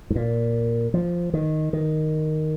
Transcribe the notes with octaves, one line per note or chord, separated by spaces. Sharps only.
G#2
A#2
F3
D#3
D#3